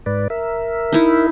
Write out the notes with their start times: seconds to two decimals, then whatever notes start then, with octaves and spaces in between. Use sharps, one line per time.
0.06 G#2 B4 D5
0.30 A#4 E5
0.92 D#4 E4